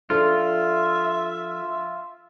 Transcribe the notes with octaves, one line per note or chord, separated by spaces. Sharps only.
F3 D4 F4 A4 E5